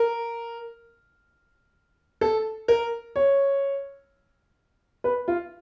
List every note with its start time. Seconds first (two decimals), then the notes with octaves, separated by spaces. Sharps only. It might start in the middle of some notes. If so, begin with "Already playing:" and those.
Already playing: A#4
2.21 A4
2.68 A#4
3.16 C#5
5.04 B4
5.28 F4